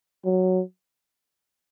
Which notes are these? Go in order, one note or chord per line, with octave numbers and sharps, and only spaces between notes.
F#3